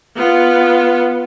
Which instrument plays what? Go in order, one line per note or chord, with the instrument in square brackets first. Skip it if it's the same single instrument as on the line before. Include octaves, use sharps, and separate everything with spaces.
[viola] B3 F4